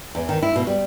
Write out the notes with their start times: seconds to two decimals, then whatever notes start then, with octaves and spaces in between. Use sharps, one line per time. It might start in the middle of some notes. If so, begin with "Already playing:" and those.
0.15 E2
0.29 D#3
0.42 E4
0.56 B2
0.67 G3